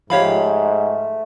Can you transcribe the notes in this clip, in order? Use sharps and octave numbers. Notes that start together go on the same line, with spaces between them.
G#2 F3 A3 G4 C#5 F5 B5